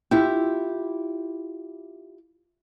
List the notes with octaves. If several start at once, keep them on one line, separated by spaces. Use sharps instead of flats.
E4 F4 G4